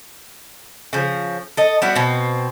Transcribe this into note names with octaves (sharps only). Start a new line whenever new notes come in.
C#3 F3
A4 D#5
G3 B3 E4 F#4
B2 C4